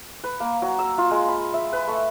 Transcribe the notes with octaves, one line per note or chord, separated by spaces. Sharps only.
B4
A#3
F#3
E6
F4
G#3
B5
E5
B4
A3